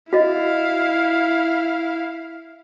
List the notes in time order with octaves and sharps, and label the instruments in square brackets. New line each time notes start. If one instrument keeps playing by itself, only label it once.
[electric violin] E4 F5 [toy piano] F#4 D#5